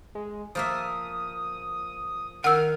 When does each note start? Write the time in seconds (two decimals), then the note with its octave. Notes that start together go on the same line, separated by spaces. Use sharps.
0.15 G#3
0.55 F3 A#3 E5 D#6
2.44 D#3 A#4 F#5 E6 F6